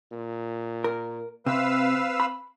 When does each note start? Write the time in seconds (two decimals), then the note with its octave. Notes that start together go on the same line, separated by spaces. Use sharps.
0.12 A#2
0.84 A#4
1.46 C3 C4 B4 F5 E6
2.20 B5